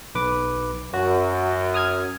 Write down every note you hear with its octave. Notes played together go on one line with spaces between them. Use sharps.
B1 B4 D6
F#2 F#4
D#6 F6 G#6